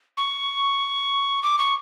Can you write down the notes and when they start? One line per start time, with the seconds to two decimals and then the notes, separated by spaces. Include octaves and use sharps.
0.17 C#6
1.43 D6
1.59 C#6